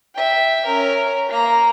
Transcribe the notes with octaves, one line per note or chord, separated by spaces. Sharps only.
E5 G5
C#4 A#4
A#3 A#5